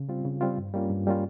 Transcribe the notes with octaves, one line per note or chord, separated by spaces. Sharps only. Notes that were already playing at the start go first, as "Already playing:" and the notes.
Already playing: C#3
G3 C4 F4
C#3
G3 C4 F4
G2
G3 A#3 C#4 F4
G2
G3 A#3 C#4 F4